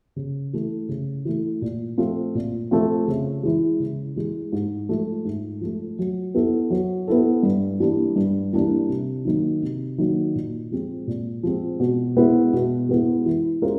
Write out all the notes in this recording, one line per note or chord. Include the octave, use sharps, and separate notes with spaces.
C#3
E3 A3
C#3
E3 A3
A#2
F3 A3 C4 F4
A#2
F3 A3 C4 F4
C#3
E3 G#3
C#3
E3 G#3
G#2
F3 A3
G#2
F3 A3
F#3
B3 E4 A4
F#3
B3 E4 A4
G2
E3 G3 A#3 D4
G2
E3 G3 A#3 D4
C3
D#3 F#3 A#3 D#4
C3
D#3 F#3 A#3 D#4
A#2
F3 G#3 C4
A#2
F3 G#3 C4
B2
G#3 B3 E4
B2
G#3 B3 E4
E3
G#3 C#4 F4 A#4